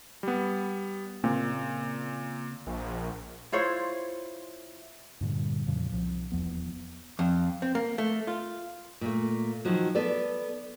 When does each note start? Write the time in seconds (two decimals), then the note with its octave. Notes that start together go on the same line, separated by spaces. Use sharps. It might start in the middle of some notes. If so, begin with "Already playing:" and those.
0.23 G3 B3
1.24 A#2 C#3 A#3 C4
2.67 A#1
3.52 E4 F4 C5 C#5
5.21 G2 A#2 D3 G3
5.66 F2 A#2 C#3 F3
5.92 C2 F3
6.32 D#1 E2 F3 B3
7.19 F2
7.62 C4
7.75 A#3
7.98 A3
8.27 F4
9.01 A#2 A3
9.65 D#3 F3 F#3
9.95 B3 A4 D5